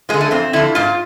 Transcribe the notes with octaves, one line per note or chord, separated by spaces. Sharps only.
D3 F3 G#3
A3
F2 C4
D3 F3 E4
G#2 F4